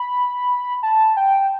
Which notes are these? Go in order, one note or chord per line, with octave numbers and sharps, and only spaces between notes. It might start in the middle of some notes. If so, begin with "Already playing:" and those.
Already playing: B5
A5
G5